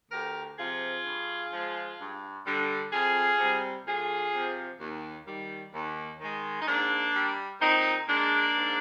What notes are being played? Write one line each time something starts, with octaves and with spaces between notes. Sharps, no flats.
D2 G4 A#4
C3 F3 F4 G#4
G2
F3 G#3
G2
D3 G3
F2 F4 G#4
C3 G3
D2 F4 G#4
C3 F3
D#2
D#3 G3
D#2
D#3 G#3
D#4
G#2 A#3 D4
G3
A#2 C4 D#4
G#3 A#3 D4
G#2